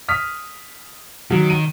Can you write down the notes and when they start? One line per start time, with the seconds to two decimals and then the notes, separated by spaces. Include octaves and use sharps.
0.08 D#6 F6 B6
1.31 D#3 F#3
1.50 D#7